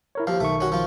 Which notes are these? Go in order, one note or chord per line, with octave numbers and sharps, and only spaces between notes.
E4 A#4 C#5
D#2 F3 F5
B1 D#3 A3 C#6
C#4 F#4
F3 F4